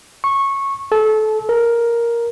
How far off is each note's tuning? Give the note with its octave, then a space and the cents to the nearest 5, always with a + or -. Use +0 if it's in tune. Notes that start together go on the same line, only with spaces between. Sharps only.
C#6 -15
A4 -25
A#4 +5